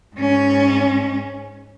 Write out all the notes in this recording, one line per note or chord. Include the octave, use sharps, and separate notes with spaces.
G#2 C#4